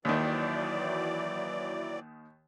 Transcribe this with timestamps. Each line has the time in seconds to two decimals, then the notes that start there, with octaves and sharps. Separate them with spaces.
0.05 D#2 D#3 E3 F#3 D5